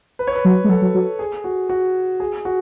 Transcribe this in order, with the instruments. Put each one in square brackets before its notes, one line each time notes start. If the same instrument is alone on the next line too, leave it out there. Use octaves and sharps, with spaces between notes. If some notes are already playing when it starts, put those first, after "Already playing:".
[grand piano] B4
C#5
B4
[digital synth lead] F#3
G#3
[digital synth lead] F#3 [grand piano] A4
[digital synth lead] F#3
F#3
[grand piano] G#4
F#4
F#4
G#4
F#4